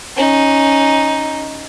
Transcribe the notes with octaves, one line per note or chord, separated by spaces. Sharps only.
C#4 D#4